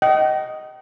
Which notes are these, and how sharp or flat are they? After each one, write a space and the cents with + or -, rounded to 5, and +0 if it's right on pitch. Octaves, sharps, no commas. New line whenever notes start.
D#5 +0 G5 -40